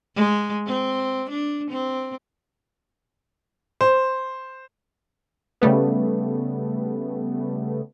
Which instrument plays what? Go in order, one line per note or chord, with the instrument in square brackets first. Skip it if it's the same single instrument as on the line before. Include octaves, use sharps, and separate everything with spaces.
[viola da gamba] G#3
C4
D4
C4
[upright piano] C5
[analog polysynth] C#3 G3 A3 B3